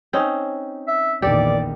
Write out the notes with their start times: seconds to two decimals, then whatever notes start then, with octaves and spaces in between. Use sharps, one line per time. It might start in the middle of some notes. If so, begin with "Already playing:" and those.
0.13 C4 C#4 D#4
0.87 E5
1.22 A#1 E2 D#3 G4 A4 D5